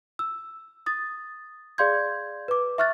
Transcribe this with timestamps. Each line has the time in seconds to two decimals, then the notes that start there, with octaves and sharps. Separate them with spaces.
0.19 E6
0.86 D#6 A6
1.78 G#4 D5 F5 C6 G6 G#6
2.48 B4 D6
2.78 E5 C#6 F6 F#6 A6